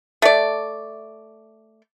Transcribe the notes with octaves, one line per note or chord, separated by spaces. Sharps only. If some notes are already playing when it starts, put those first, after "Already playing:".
A3 D5